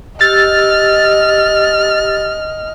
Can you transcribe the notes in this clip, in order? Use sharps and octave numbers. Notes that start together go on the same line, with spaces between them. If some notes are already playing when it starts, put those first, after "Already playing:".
G4 D#5 E6 F6 A6